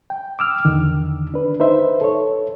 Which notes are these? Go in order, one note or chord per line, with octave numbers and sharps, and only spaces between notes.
G5
D6 E6 F6
E2 D3 D#3
D4 B4
D#4 B4 C5 E5
A4 C#5